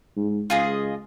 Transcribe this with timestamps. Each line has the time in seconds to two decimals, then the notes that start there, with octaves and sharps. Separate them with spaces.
0.16 G#2
0.50 C#2 F4 G#4 D#5